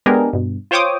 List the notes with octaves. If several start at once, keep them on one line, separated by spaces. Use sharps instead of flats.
G#3 B3 D4 G4 G#4 A#4
G2 B2
F4 C5 C#5 G5 D6 D#6